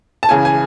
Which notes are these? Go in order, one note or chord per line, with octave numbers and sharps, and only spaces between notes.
A5
C#2 C#3 E3 G#5
G#5